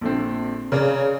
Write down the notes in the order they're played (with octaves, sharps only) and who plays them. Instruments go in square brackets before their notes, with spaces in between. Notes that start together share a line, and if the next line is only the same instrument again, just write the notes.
[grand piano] A#1 D3 C4
[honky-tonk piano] C#3 [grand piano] A#4 D5 A#5